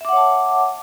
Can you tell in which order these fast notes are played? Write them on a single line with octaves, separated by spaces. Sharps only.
E5 D6 F#5 C#5 A5